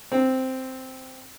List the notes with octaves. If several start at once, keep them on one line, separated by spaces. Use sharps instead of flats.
C4